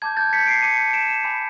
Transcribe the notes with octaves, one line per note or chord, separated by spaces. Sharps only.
A5 D6 G6 G#6
G6 A6
B6 C#7
C7 D7
A5 D6 G6 C#7 D#7
D7 E7
G#5 B5 D6